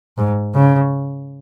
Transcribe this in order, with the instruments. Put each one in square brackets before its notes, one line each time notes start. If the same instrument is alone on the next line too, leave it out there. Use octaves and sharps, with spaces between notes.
[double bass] G#2
C#3